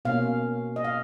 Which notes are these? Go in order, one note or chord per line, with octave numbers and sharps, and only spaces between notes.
B2 A#3 C#4 F5
D#5
F5